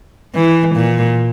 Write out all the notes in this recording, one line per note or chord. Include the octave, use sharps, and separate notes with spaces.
E3
A#2